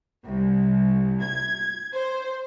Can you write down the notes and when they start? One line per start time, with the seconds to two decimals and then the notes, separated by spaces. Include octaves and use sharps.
0.25 C2
1.23 G#6
1.95 C5